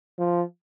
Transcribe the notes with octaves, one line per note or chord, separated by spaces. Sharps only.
F3